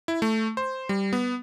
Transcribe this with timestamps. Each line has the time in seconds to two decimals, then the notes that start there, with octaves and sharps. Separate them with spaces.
0.08 E4
0.22 A3
0.57 C5
0.89 G3
1.13 B3